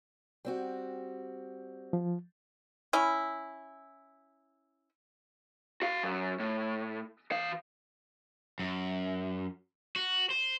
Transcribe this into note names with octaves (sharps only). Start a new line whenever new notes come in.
G3 C4 F#4
F3
C#4 E4
F#4 F5
F#2
A2
E3 F5
F#2
F#4
C5